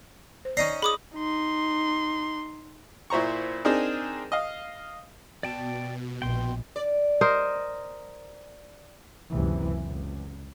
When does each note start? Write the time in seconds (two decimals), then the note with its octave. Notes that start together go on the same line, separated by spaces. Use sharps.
0.45 C5
0.57 C#4 D#4 D5 A#5 C7
0.82 G#4 B5 D6 D#6
1.15 D#4 C6
3.10 A#2 E4 C5 A#5 C#6
3.65 C4 D4 D#4 G#4 A#4
4.32 D#5 F5
5.43 B2 D5 G5 A5
6.22 A#1 G5 C6
6.76 D5
7.21 A#4 C5 D#5
9.30 F#1 C#2 C3 E3
9.85 C#2